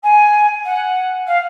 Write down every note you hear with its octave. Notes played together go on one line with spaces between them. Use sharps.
G#5
F#5
F5